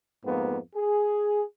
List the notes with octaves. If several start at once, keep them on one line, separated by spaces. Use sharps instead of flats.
F2 G#2 A#3 B3
G#4